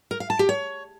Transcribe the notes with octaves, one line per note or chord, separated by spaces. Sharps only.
A#4
F5
A5
G4
C#5